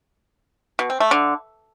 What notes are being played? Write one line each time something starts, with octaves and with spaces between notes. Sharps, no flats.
B2
C4
A3
D3